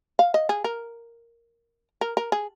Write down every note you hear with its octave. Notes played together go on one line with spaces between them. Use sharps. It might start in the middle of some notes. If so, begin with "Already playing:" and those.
F5
D#5
G#4
A#4
A#4
A#4
G#4